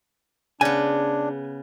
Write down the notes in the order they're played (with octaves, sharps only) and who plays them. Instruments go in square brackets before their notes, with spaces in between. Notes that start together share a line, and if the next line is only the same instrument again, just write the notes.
[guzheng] C#3 B3 [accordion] D4 [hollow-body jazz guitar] G#5